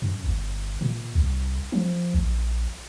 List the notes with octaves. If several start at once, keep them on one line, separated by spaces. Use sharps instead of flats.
F#2
G1
A#2
C2
F3
A#1